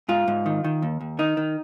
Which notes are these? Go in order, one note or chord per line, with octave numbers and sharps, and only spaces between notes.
G#2 F4
G#2
D#3
D#3
D#2
D#2
D#3 D#4
D#3